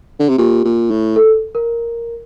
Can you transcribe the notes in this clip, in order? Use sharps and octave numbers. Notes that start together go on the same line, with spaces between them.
D3
C3
A#2 G4
A#2
A2
A4
A#4